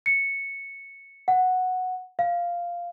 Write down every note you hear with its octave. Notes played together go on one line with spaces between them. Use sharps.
C#7
F#5
F5